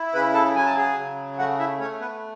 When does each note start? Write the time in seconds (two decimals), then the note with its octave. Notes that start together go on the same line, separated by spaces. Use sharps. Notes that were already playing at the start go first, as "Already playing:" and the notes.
Already playing: E4
0.14 C#3 B4 B5
0.34 A4 A5
0.55 F#3 G#5
0.66 A5
0.77 G#4 G#5
0.97 C#3
1.38 A3 F#4 F#5
1.59 E4 E5
1.79 A3 C#4 C#5
2.00 B3 B4